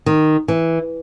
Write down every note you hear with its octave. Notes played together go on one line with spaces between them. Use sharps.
D#3
E3